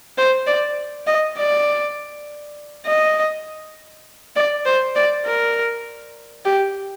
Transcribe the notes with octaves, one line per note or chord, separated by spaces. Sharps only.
C5
D5
D#5
D5
D#5
D5
C5
D5
A#4
G4